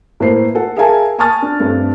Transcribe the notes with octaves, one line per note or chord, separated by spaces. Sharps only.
A2 A#3 B4 C5 C7
A4 F#5
G#4 A#4 E5 F5 G#5 A5
G#5 A5 C#6 D#6 F6 A6
D4
G2 A3 C4 D4